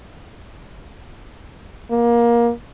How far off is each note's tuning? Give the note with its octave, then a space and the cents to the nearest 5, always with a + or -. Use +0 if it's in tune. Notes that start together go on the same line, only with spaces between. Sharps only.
A#3 +20